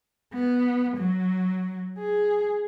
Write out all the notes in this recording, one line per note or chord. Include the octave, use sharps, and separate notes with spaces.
B3
F#3
G#4